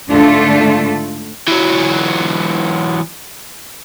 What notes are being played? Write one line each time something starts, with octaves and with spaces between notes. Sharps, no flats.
G#2 D3 A3 D4 F4 A4
E3 F#3